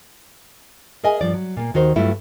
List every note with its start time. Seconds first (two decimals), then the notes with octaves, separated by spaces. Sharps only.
1.04 G#4 A#4 D#5 E5 G#5
1.21 G2 F3 D5
1.34 F#3
1.57 A#2 A#3
1.74 D#2 D#3 F#4 A#4 C5
1.96 G2 F#3 A3 E4 F4